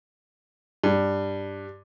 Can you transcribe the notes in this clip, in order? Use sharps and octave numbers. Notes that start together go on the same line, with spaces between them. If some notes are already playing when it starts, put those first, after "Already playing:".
G2